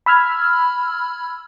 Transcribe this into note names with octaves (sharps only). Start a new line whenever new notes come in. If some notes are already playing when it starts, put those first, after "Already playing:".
B5 E6 F6 G#6